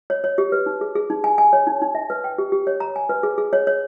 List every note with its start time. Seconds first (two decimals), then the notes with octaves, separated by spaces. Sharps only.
0.10 C#5
0.24 C#5
0.38 G4
0.52 B4
0.66 D#4
0.81 G#4
0.96 G#4
1.10 D#4
1.24 G#5
1.38 G#5
1.53 C#5
1.67 D#4
1.82 D#4
1.95 E5
2.10 B4
2.24 G5
2.38 G4
2.52 G4
2.67 C#5
2.80 A#5
2.96 G#5
3.09 B4
3.23 G#4
3.38 G#4
3.53 C#5
3.67 C#5